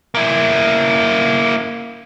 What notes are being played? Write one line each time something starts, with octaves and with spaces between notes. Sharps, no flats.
A#3 E4